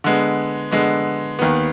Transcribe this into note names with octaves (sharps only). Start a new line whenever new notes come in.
D3 G#3 B3
D3 G#3 B3
D#2 D#3 B3